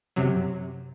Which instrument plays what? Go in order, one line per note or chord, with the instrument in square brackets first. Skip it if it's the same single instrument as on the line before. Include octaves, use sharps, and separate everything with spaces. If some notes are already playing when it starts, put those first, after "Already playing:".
[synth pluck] F#2 C3 F#3